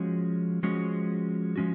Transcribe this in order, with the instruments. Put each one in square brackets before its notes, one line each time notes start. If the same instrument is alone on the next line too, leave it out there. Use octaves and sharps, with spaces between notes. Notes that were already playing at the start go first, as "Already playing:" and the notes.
Already playing: [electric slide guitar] F3 G#3 C#4 F#4
F3 G#3 C#4 F#4
F3 G#3 C#4 F#4